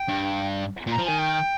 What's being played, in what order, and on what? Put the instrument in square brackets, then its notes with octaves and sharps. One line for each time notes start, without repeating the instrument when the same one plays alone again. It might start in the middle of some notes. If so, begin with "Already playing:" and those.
Already playing: [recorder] G5
[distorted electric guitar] G2
A#2
[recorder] A#5
[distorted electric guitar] F3
[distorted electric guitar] D#3 [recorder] G#5
[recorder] G5